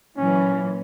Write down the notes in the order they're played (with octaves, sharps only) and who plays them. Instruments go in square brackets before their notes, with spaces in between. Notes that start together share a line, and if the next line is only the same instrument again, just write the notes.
[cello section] A#2 E3 F#3 [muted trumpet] C#4